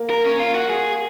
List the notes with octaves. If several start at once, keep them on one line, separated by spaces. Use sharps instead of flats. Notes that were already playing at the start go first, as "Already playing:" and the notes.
Already playing: A#3
A#4
C#4
F4
F#4
G#4